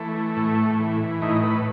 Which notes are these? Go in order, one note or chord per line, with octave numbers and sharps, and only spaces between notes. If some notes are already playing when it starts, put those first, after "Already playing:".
Already playing: E3 A3
A2
E3
A2 D#4
B4